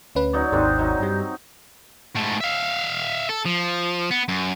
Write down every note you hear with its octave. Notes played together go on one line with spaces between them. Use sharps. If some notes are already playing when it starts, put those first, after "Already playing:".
D2 C#4 B4
F#3 D#4 D5
G#1 D#2 C4 D4 D#4
F#3 D#4
G2 G3
G#2 A3
E5 F5
A4
F3
B3
F#2